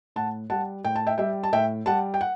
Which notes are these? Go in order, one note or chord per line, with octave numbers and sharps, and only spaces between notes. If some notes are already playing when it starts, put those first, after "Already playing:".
A2 F#5 A5
G3 F#5 A5
A2 G5
A5
E5 G5
G3 E5 G5
A5
A2 E5 G5
G3 F#5 A5
G5
F#5